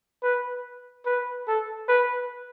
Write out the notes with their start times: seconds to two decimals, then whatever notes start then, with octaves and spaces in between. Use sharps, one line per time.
0.23 B4
1.05 B4
1.47 A4
1.88 B4